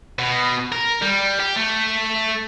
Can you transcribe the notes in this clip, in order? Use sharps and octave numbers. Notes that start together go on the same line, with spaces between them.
B2
A#4
G3
G4
A3